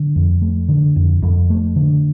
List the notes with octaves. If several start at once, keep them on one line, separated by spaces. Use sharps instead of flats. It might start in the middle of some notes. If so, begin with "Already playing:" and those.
Already playing: D3
F2
A3
D3
F2
F2
A3
D3